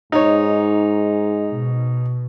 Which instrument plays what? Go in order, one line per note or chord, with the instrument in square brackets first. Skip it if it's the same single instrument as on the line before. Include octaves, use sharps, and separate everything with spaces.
[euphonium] G#2 [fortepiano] D#4 C#5
[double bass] B2